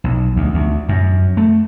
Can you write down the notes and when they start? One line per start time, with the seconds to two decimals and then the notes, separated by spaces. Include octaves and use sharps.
0.04 B1
0.36 D2
0.54 D2
0.89 F#2
1.37 A3